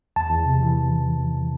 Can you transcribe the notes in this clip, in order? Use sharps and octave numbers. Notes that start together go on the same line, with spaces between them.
E2 A5
E2
C3
E3